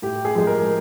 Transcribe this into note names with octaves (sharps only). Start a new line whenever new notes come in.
A2 G4
G#4
F3 G#3
A#4